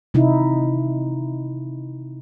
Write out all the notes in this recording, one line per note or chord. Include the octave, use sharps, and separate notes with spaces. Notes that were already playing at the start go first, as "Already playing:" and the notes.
C3 D#4 E4